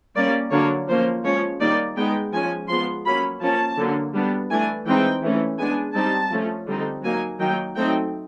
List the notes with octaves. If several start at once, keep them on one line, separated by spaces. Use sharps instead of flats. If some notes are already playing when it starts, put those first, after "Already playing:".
G3 A#3 C#4 D5
D3 F#3 A#3 D4 C#5
F3 A#3 C#4 C5
F3 G#3 C#4 C#5
D#3 G3 A#3 D#4 D5
G#3 B3 D#4 G5
F3 G#3 C#4 G#5
F3 G#3 B3 C6
F#3 A#3 C#4 B5
F3 A#3 C#4 A5
D3 F#3 A#3
G3 B3 D4
E3 A3 D4 G#5
E3 G#3 C4 D#4 G5
E3 A3 C#4
G#3 B3 D4 G#5
G3 C4 D#4 A5
F3 A3 C#4
D3 G3 C4 D#4
F#3 A#3 D#4 G#5
D#3 F#3 A#3 D#4 G5
F#3 A3 C4 D#4 G5